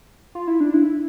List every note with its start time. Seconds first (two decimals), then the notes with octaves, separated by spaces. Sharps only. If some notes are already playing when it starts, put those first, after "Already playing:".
0.35 F4
0.48 E4
0.60 D4
0.74 E4